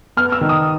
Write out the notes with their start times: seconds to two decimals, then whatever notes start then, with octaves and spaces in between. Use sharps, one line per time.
0.17 B3 F6
0.32 E6
0.41 D#3
0.49 D#6